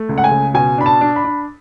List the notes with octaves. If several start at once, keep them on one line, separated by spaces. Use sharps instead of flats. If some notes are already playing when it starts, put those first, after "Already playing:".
Already playing: A3
C#2
F#5
G#5
C#3
B2 G#5
D4 B5
A5
D4
B5
D4